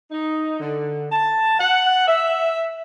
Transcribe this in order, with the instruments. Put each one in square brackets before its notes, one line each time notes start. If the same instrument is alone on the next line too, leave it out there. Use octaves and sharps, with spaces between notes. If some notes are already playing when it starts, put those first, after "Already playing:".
[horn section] D#4
D3
A5
F#5
E5